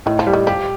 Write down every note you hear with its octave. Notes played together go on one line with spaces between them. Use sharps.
A2 D#3
F3
G3
D#3
F3 G4